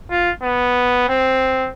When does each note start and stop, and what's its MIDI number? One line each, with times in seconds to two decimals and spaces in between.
0.10 0.31 65
0.42 1.06 59
1.09 1.69 60